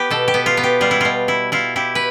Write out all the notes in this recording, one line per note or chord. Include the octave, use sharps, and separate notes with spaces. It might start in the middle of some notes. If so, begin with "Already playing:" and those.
Already playing: B3 G4 B4
B2 A4
G4
B3
F4
B3
G4
G3 F4
E4
B2 F4
E4
E4 F4
E4 G4
B4